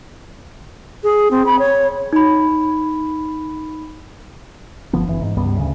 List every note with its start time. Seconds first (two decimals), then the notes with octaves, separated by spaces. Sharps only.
1.04 G#4
1.31 C4
1.46 B5
1.59 C#5
2.13 D#4 B5
4.93 G1 D3 F3 B3
5.07 F#1 E3
5.22 G#2
5.37 C#2 G2 G3 B3
5.57 D2 C#3